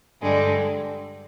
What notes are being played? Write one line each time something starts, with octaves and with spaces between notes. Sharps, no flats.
G2 D3 G3 G#3